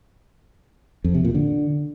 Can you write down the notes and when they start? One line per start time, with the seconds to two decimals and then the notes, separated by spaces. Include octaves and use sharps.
1.04 F2
1.14 C3
1.25 A#2
1.35 D3